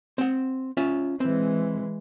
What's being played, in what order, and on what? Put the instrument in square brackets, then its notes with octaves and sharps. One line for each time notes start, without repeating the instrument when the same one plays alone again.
[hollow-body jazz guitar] C4 F#5
C#4 F4 E5
[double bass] E3 G#3 [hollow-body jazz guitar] C4